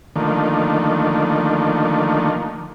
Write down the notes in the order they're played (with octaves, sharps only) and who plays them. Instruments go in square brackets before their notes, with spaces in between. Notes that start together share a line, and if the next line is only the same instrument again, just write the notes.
[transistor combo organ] D3 D#3 F3 A3 A#3